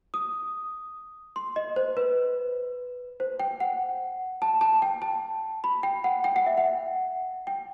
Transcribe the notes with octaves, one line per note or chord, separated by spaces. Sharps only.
D#6
C6
D#5
C5
B4
C5
G5
F#5
A5
A5
G5
A5
B5
G5
F#5
G5
F#5
E5
F#5
G5